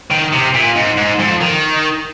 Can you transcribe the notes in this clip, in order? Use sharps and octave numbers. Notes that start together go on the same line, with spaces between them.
D#3
C3
A#2
G#2
G#2
F2
D#3